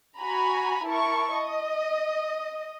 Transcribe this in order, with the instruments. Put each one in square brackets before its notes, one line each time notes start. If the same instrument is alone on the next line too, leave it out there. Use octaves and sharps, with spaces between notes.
[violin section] F#4 G#5 A#5 B5
E4 A#4 A5 C#6
D#5